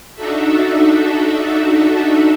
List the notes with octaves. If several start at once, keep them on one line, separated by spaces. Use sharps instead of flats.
D4 D#4 F#4 A4 E5